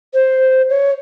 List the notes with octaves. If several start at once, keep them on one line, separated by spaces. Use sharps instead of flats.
C5
C#5